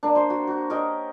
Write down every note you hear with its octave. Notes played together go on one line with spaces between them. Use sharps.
A#3 D4
C5 C6
F#4
F#4
G4 A#4 C#5 D#5